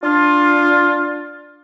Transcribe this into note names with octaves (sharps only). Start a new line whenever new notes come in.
D4 F4